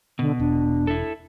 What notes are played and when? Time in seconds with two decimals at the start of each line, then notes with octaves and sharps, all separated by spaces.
0.19 B2 D3
0.39 E1 D4
0.87 E4 A4